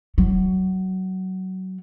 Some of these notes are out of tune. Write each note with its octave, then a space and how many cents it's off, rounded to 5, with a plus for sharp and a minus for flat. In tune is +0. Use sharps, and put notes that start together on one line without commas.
F#3 +20